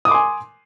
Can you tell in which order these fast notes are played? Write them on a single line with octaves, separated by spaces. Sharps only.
D#6 D6 C6 G#5